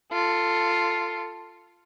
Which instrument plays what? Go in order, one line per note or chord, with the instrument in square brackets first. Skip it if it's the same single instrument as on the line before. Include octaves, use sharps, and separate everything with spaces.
[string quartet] F4 A4